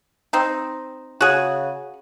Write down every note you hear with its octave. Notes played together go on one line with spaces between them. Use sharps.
C4 D#4
C#3 F#4 G#4